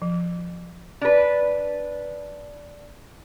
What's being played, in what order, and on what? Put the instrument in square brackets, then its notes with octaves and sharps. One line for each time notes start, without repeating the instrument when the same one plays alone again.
[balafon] F3
[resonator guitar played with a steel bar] D4 B4